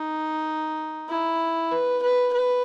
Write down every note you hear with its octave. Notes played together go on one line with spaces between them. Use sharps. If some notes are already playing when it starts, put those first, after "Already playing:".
Already playing: D#4
E4
B4
B4
B4